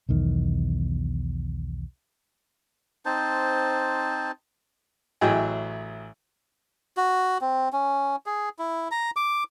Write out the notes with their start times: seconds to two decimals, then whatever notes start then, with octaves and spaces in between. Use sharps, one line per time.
0.09 B1 E2 D#3
3.05 C4 D#4 C5 A5
5.21 A1 F#3 E4 G#4 D#5 G5
6.97 F#4
7.41 C4
7.73 C#4
8.26 G#4
8.59 E4
8.91 A#5
9.16 D6